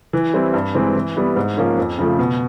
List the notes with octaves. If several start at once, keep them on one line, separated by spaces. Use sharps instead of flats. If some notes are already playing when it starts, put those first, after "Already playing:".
E3
G3 C4 E4
G2
E3 G#3 C4
E3
G3 B3 E4
G#2
F3 A#3 C#4
F2
C#3 F3 A3
B2